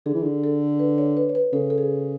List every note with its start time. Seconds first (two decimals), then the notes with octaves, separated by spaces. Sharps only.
0.06 D3 G#4
0.15 E3
0.23 D3
0.44 A4
0.79 B4
0.98 C#5
1.17 B4
1.29 C#5
1.35 B4
1.53 C#3 A4
1.70 A4
1.78 G#4